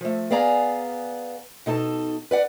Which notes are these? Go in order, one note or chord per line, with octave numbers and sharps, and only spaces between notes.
F3 A3
B3 G#4 D5 F5 G#5 A#5
B2 D#4 A4 A5
B4 D5 F#5